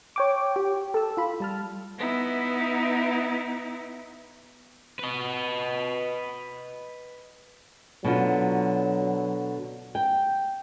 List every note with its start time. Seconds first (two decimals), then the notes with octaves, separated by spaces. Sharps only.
0.16 C#5 G5 D6
0.56 G4
0.94 A4 E6
1.17 F4 B5
1.40 G3 A5 F6
1.99 B3 D#4 E4
4.99 B4 D#5
8.04 B2 D3 F#3 F4
9.95 G5